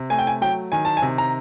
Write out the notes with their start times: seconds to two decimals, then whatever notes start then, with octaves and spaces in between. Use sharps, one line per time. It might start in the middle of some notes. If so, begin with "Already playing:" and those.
Already playing: C3
0.10 A3 G#5
0.19 G5
0.27 G#5
0.41 F#3 G5
0.72 D#3 G#5
0.85 A5
0.97 G#5
1.02 C3
1.18 A#5